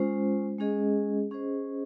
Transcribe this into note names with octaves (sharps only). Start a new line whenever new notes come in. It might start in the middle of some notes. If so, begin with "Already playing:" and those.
Already playing: G#3 C#4 F4 C5
G#3 C#4 G#4 D#5
C#4 G#4 C5 D#5